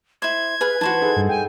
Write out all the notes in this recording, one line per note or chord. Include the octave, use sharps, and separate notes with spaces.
E4 C5 G#6
G#4 B4 F5 G#5
E3 F#4 C5 A5
D#4 G#4 A4
G2
G5 G#5